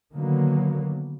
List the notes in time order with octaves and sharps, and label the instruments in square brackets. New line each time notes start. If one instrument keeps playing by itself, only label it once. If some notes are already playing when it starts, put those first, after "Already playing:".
[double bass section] D3 D#3 F#3 A#3 B3